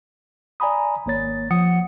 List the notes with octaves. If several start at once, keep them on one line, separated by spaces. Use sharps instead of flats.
D5 G#5 A#5 B5 D#6
G#1 A#3 C#5 A6
F3 F#5 D#6 C#7